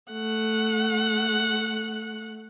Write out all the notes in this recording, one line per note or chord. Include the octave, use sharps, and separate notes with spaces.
A3 F#5